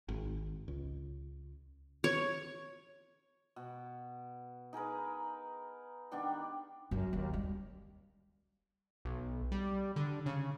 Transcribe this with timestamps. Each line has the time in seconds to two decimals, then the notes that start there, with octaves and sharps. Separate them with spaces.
0.09 G#1
0.68 C#2
2.04 C#5
3.56 B2
4.73 D#4 G#4 A#4 B4
6.11 D#3 B3 D4 G4
6.91 F#2
7.13 D#2
7.33 G3
9.05 B1
9.52 G3
9.96 D3
10.26 C#3